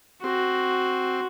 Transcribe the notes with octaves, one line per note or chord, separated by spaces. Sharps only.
C4 F#4